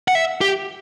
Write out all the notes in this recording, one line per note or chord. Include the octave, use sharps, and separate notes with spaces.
F#5
E5
G4